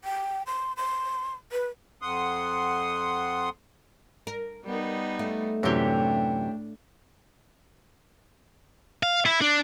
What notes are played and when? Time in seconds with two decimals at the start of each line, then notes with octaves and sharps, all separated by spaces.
0.04 G5
0.47 C6
0.77 C6
1.52 B4
2.02 F2 F#5 C6 D#6
4.27 A#4
4.65 G3 B3 D#4
5.19 A3
5.63 F#2 A2 C3 E3 D4 G4 C#5
9.03 F5
9.26 E4
9.42 D4